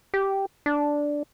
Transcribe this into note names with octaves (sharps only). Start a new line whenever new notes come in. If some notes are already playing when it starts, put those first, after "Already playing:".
G4
D4